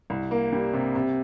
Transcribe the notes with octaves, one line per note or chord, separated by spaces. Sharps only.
C2
A#3
G3
C3
C3